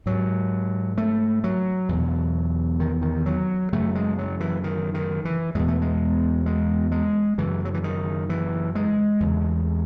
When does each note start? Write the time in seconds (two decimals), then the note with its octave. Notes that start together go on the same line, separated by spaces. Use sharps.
0.06 G#2 F#3
0.98 A3
1.44 F#3
1.89 E2 B2
2.80 D#3
3.02 D#3
3.26 F#3
3.73 F#2 C#3 A3
3.95 G#3
4.18 F#3
4.40 E3
4.64 D#3
4.94 D#3
5.25 E3
5.55 E2 B2 G#3
5.68 A3
5.82 G#3
6.46 G#3
6.92 G#3
7.38 F#2 C#3 E3
7.65 F#3
7.74 E3
7.84 D#3
8.30 E3
8.75 G#3
9.20 E2 C#3